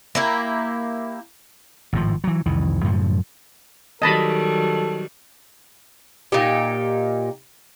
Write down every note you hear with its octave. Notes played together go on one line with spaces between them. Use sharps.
A#3 E4 G4
G#1 A2 F3
E3 F#3
C2 F2 D#3 E3
F#2 A2 C#3 F3
D#3 F#3 G3 A4 D#5 A5 B5
A#2 D#4 G4